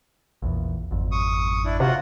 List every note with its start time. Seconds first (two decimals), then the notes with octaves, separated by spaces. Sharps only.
0.42 A#1 E2
0.91 G#1 F2
1.12 C#6 D#6
1.65 D4 E4
1.80 C3 F4 F#4 F#5